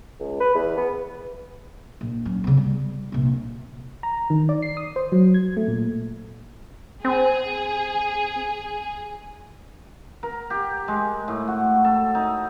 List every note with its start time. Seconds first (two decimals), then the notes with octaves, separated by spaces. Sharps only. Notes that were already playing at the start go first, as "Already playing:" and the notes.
0.20 C#2
0.40 B4
0.55 E2
0.77 B3
2.01 A#1
2.25 F#3 C#4
2.44 C#3 B3
2.57 G3
3.12 A#1 C3
4.03 A#5
4.30 D#3
4.49 D5
4.62 C7
4.77 D#6
4.96 C5
5.12 F#3
5.34 G#6
5.57 A3
5.68 A#2
7.05 C4 G#4
10.23 A#4
10.50 G4
10.88 G#3
11.28 A2
11.47 F#4
11.84 A4
12.15 D#4